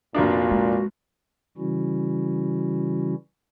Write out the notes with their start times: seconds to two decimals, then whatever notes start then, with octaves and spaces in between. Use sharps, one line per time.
0.15 F1 A#2 A#3 D4 F#4
0.51 G#3
1.58 C#3 E3 G3 C#4 E4 F#4